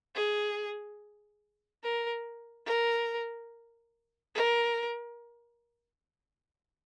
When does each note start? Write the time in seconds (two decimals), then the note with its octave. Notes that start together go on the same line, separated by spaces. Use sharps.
0.15 G#4
1.84 A#4
2.66 A#4
4.35 A#4